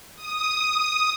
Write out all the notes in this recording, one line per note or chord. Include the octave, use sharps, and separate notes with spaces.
D#6